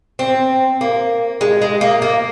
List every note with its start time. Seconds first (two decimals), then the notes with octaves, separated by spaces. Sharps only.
0.19 C4
0.81 A#3
1.41 G#3
1.62 G#3
1.81 A#3
2.02 A#3